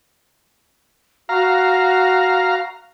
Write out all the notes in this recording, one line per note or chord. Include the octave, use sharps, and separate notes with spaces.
F#4 F5 A#5